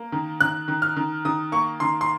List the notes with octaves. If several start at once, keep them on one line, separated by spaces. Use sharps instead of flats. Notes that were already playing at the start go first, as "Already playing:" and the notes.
Already playing: A#3
D#3
D#3 F#6
D#3
F6
D#3
D#3 D#6
A#3 C#6
D#3 C6
C6